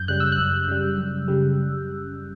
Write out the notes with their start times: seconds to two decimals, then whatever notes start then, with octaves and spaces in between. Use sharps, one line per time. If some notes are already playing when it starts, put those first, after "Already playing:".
Already playing: F#2 G6
0.08 C#3 G3 F#6
0.20 E6
0.32 F#6
0.38 F#2
0.68 C#3 G3
0.98 F#2
1.28 C#3 G3